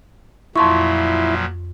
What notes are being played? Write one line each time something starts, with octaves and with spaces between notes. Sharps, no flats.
F2 A#2 F3 F#3 E4 C6 C#6